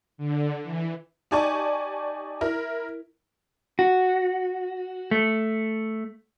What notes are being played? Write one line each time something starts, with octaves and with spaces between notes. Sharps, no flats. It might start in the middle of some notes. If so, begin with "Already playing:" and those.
D3
E3
D#4 G4 D5 G#5 A5 C#6
E4 A#4
F#4
A3